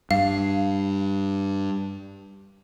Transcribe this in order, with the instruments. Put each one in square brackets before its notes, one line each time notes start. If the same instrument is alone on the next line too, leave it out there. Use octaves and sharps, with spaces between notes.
[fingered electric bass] G2 [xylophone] F5